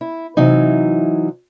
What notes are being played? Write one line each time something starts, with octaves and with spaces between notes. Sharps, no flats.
E4
C3 E3 F#3 D#4